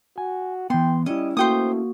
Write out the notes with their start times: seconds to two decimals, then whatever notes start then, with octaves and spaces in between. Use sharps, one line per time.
0.18 F#4 G#5
0.70 E3 B3 G5 C6
1.06 G3 C#4 E4 D#5
1.37 A3 A#3 F#4 C5 G5 D#6